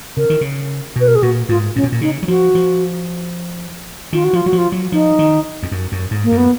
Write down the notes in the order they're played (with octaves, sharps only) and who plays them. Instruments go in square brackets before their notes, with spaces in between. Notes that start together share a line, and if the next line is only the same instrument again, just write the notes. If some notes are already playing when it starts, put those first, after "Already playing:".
[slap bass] C#3 [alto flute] A#4
[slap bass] D#3
C#3
[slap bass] B2 [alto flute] B4
[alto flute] A#4
G#4
[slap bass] A#2 [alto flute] F#4
[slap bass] G#2 [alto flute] F4
[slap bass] A#2 [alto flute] C#4
[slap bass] B2
A#2
[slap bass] C#3 [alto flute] D#4
[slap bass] F#3
[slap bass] F3 [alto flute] F#4
[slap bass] F3
[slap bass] D#3 [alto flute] F4
[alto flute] F#4
[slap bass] F3 [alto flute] F4
[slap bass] F#3 [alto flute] F#4
[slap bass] F3
[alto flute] F4
[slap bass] F#3
[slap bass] F3 [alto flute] D#4
[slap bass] D#3
F2
F#2
F#2
G#2
[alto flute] A#3
[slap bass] F#2
[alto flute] B3